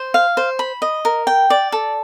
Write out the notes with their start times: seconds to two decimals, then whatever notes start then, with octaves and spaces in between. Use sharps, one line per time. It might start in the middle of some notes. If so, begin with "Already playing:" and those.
Already playing: C5
0.14 F5
0.37 C5
0.59 B5
0.82 D#5
1.05 A#4
1.27 G5
1.50 D5
1.72 A4